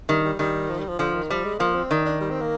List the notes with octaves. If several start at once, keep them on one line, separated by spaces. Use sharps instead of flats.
D#3 G3
G3
D#3 G3
F3
G3
F3
D3 F3
D#3
F3 G3
G#3
F3 A#3
C4
D#3 D4
D4
G3
C4
A#3